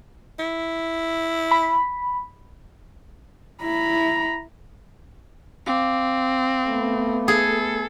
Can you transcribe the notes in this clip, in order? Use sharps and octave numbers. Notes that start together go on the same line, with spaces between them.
E4
B5
E4 A#5 B5
C4 F5 D6
A3 B3
G#4 A4